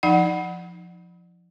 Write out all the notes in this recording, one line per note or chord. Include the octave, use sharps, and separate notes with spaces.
F3 D#4 F#5